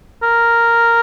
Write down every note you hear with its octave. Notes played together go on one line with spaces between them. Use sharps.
A#4